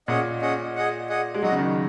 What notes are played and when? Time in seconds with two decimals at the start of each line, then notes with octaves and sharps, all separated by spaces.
0.08 A#2 C#4 G#4 D#5 F#5
0.42 C#4 G#4 D#5 F#5
0.75 G#4 D#5 F#5
1.09 G#4 D#5 F#5
1.34 G#3
1.43 F#3 D#4 F#4 D#5
1.52 C#3
1.59 D#3